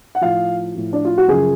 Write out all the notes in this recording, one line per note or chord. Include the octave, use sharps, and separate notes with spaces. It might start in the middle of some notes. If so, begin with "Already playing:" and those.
F#5
A2 F3 F5
A2 F3
D4
F4
F#4
F#2 C#3 F3 G#4